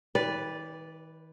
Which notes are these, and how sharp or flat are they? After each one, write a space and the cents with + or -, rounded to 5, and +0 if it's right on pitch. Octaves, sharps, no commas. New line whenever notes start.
D#3 +45 B4 +0 D5 -10